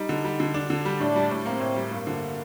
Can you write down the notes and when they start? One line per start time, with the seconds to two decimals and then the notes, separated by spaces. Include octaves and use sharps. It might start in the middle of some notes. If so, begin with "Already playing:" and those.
Already playing: G3 D#4
0.09 D3
0.24 G3
0.40 D3
0.54 D4
0.70 D3
0.85 G3
1.00 A2 D4
1.16 G3
1.31 A2
1.45 A#3 C4
1.60 A2
1.76 G3
1.91 G2 A#3
2.07 D3